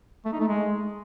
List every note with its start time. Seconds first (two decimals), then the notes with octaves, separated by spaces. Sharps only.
0.25 A3
0.33 D#4
0.40 A3
0.48 G#3